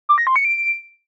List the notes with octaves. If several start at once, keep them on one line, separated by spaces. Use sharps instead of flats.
D6
A#6
C6
C#7
D7